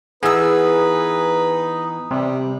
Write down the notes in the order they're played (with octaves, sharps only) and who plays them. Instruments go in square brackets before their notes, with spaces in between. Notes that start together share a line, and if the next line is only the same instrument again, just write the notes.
[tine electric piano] E3 B3 [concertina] D#4 [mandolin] G#4 E6 [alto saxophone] B4
[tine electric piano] C3 [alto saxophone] G3